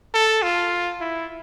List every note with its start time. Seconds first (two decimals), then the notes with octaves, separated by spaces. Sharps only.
0.14 A4
0.42 F4
1.00 E4